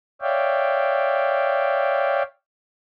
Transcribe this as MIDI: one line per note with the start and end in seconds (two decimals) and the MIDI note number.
0.22 2.23 73
0.22 2.23 74
0.22 2.23 76
0.22 2.23 77
0.22 2.23 79